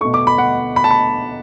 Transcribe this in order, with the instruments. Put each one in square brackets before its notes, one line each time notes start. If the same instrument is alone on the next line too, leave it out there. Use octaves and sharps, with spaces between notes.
[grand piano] B2 A3 C#6
D6
B5
F#5
B5
A5
B5